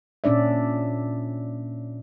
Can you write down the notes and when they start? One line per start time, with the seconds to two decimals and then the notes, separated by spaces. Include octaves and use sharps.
0.24 A#2 C#4 D4 D5 E5